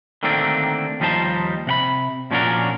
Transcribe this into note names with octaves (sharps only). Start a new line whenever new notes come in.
D3 D#3 A3 A#3 C4 D4
D#2 F3 G3 D#4 C5 A5
C3 F#5 B5
A#2 F3 C#4 D4 F#4 A#4